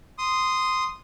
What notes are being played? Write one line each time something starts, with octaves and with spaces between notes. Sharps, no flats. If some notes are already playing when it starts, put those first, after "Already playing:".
C6 D#6